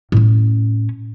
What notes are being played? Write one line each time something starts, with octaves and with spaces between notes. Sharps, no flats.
A2 C#4